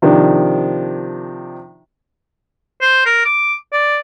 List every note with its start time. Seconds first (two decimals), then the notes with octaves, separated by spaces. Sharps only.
0.02 C3 D#3 F3 D4
2.81 C5
3.06 A#4
3.25 D6
3.72 D5